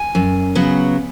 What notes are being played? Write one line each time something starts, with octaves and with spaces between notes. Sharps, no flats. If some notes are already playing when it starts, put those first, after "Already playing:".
Already playing: G#5
F#2
C#3 F#3 B3